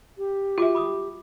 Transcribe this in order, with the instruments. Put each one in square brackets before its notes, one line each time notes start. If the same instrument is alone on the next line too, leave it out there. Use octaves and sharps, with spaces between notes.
[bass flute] G4
[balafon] F4 E5 [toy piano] F#4 D6
[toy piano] B5 D6 D#6